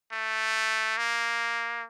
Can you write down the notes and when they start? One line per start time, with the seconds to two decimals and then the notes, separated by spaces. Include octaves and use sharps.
0.12 A3
0.97 A#3